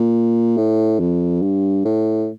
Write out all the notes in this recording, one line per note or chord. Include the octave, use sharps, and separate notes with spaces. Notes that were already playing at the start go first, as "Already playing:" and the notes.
Already playing: A#2
A2
F2
G2
A2